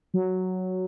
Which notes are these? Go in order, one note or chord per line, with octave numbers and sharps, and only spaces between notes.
F#3